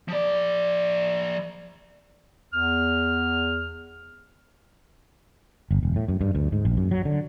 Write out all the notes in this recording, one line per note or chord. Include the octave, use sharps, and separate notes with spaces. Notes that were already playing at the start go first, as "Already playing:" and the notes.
F3 D5
E2 F6
G1
E1
A2
F#2
G2
D2
G#2
A#1
F#2
F#3
D3